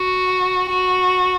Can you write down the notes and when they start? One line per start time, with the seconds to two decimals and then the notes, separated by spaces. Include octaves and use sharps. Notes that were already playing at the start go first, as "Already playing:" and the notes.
Already playing: F#4
0.69 F#4